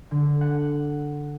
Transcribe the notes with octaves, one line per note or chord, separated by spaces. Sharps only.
D3
F#5